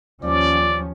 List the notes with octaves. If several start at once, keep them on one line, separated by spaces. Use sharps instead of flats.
D#2 F3 C#4 D5